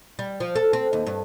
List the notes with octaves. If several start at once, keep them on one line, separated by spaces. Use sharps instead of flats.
G3
F3
A4
C4
D#2
G2